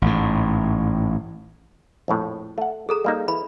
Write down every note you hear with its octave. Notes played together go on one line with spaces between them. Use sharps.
A1 G#2
A#1 F2 A2
A3 F#5
G#4 A4 A#5
G3 A#3 D#4
E3 B5